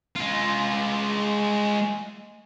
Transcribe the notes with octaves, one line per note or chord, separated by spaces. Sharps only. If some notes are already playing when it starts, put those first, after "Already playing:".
G#3 F4